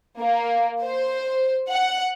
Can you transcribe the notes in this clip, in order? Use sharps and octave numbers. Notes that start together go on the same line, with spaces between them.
A#3
C5
F#5